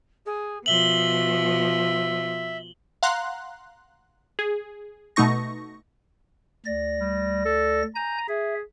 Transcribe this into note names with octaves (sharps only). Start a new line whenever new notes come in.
G#4
B2 F3 E5 F#7 G7
F5 F#5 A#5 C6 F#6
G#4
B2 A3 D#4 C#6 A#6
D2 D5 A#6
G3
A4
G#5 A#5 G6
G#4 E5